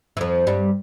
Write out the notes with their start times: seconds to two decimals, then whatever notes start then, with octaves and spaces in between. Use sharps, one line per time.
0.17 E3
0.21 F2 F3
0.47 G2 G3